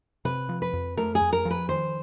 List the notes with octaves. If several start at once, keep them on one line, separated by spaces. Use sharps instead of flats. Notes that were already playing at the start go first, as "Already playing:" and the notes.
C3 B4
F3
B4
F2
A3 A#4
G#4
F2
A#4
F3
B4
D#3 C5